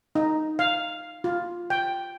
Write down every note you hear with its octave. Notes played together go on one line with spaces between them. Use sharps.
D#4
F5
F4
G5